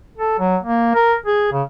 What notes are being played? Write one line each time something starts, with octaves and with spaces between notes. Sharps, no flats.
A4
F#3
A#3
A#4
G#4
C#3